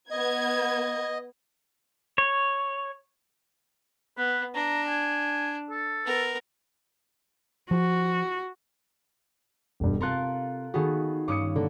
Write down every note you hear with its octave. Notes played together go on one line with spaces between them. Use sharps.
B3 D#5 G#6
C#5
B3 B4
D4 A#5
G#5
A4
B3 A#4
F3 F#4
E1 G2
C3 F4 A4 A#4 C6 F#6
D#3 B3 F#4 G#4 A4
G2 C#4 D6 D#6 C#7
D3 A#3 A4